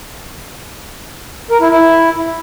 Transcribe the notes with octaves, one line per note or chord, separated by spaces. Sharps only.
A#4
E4
E4